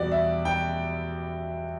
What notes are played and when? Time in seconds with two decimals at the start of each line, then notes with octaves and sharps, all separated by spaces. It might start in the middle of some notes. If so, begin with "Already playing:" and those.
Already playing: E2 B2 G3 F#4 G4 D5
0.12 E5
0.45 G5